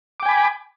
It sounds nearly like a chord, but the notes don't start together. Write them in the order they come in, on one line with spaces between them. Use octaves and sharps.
D6 G5 G#5 B5